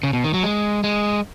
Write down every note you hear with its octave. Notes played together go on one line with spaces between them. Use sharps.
C#3
B2
D#3
F#3
G#3
G#3